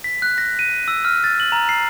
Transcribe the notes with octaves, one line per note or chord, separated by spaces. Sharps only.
B6
F#6
A#6
D#7
E6
F6
A6
F#7
A#5
C7